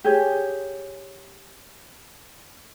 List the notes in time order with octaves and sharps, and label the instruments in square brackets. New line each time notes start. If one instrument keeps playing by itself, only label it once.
[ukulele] G4 G#4 C#5